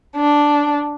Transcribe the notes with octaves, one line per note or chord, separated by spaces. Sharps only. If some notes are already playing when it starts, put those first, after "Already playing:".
D4